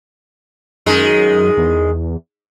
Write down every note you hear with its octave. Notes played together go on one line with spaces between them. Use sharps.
F#2 D#3 G#3
E2